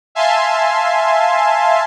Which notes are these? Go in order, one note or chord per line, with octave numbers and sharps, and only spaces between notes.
E5 F5 G#5 A5 C6